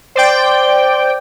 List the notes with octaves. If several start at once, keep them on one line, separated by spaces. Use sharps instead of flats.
C5 D5 G5